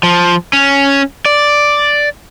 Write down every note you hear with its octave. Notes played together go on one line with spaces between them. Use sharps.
F3
C#4
D5